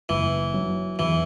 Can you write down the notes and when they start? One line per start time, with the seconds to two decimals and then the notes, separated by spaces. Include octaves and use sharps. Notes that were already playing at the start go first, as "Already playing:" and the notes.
0.09 F#1 E3
0.54 F#3
0.99 E2 E3